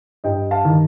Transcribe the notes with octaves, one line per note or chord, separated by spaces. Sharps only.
G2 D#5 G5
F5 A5
D#3